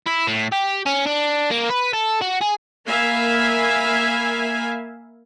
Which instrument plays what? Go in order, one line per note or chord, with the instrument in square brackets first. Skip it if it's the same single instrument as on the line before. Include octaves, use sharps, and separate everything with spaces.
[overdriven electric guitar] E4
A2
G4
C#4
D4
A#3
B4
A4
F#4
G#4
[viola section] A#3 A#4 E5 F5 G#5 B5